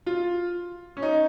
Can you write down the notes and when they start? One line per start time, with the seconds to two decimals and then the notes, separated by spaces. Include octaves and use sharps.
0.06 F4
0.97 C#4
1.02 D#4